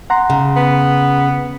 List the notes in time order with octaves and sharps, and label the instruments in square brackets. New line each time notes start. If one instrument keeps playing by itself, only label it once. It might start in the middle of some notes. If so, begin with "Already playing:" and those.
[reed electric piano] F#5 A#5 C6
[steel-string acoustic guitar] C#3
[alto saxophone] B3